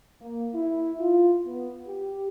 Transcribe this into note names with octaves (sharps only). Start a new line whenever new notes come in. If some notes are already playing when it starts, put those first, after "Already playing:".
A#3
E4
F4
B3
G4